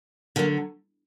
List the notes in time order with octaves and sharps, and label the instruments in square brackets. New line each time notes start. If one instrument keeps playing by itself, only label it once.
[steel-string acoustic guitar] D3 F#3 A#3